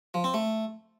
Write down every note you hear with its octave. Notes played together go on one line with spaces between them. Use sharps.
F3
C4
A3